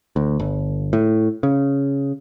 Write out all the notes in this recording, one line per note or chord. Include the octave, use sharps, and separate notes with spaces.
D2
G1
A2
C#3